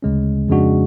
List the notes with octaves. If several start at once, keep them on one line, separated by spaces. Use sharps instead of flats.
D2 C#3 G#3 C#4
F2 C#3 G#3 D4 F#4